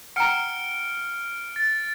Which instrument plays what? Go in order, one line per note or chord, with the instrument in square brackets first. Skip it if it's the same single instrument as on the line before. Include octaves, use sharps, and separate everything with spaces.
[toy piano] F#5 G5 A#5 [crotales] F6 C#7 D7
[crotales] A6